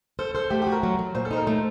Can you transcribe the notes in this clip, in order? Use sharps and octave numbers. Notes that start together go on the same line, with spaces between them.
A4 C5
A4 C5
A3 G4
G4
F#4
A#4
F#3
F#3
A#2 C5
A4
D#4 C5
A#4
A3 C5